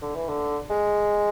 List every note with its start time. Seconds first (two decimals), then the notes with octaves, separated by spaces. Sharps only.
0.02 D3
0.15 E3
0.28 D3
0.70 G#3